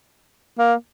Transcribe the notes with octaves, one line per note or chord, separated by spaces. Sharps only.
A#3